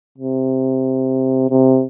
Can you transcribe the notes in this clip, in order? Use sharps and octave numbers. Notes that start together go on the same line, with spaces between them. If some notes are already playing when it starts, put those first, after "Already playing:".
C3
C3